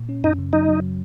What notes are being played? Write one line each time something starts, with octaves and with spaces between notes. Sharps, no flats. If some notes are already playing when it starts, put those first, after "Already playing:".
Already playing: A#2
C#4
F#2 D#4
C#3
F#3 D#4
F#3